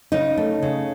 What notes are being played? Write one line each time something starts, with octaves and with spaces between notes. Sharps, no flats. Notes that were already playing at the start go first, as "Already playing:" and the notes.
C#3 D#4
A3
C#3